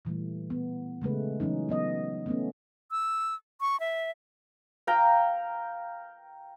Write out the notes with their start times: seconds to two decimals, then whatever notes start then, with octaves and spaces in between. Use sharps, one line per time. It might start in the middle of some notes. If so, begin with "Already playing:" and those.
0.05 A#2 E3 G3 A3
0.50 B3
1.02 C#3 G#3 A3 B4
1.40 E3 F#3 C#4 D#4
1.69 F#3 B3 D#5
2.26 A3 B3 C#4
2.91 E6
3.61 C#6
3.80 E5
4.87 F5 G5 A#5